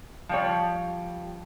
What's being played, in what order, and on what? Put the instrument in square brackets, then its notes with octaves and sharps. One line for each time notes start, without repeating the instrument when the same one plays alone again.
[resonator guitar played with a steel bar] F3 G3 C#5